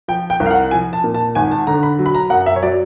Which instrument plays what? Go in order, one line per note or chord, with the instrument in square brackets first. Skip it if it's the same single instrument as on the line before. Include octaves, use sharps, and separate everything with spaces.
[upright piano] F3 G5
G5
C2
F5
F#5
F3 G#5
A5
A#2
A5
G#1 G#5
A5
D3 A#5
B5
F#3
B5
A#5
F#2 F#5
E5
C#5
F#3 D5